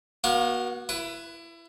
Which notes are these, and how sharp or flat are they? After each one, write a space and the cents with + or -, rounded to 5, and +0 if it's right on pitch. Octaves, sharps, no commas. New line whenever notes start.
B3 -45 F#4 +0 F5 +15
E4 +25 B4 +0